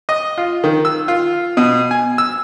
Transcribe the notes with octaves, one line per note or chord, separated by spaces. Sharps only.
D#5
F4
D#3
E6
F4
B2
G#5
E6